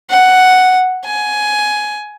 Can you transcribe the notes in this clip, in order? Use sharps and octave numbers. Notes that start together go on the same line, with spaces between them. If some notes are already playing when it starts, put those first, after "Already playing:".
F#5
G#5